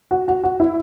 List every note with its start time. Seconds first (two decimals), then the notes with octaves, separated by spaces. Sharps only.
0.11 F#4
0.28 F#4
0.44 F#4
0.60 E4